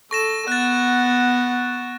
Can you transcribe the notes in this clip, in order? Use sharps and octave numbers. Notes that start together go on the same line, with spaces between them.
A4 C#6 A#6 E7
B3 F#5 F#6 A6